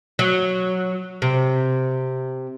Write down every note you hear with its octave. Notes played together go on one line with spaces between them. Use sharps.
F#3
C3